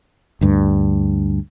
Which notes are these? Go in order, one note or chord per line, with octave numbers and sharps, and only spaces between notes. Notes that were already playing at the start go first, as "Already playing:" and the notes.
D2 G2